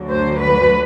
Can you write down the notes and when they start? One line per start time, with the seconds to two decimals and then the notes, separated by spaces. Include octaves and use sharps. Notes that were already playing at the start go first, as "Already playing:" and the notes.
Already playing: D2 D3 F#3
0.09 C5
0.40 B4